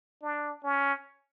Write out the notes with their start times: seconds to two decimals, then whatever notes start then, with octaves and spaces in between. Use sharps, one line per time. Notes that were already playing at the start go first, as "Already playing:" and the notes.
0.23 D4
0.64 C#4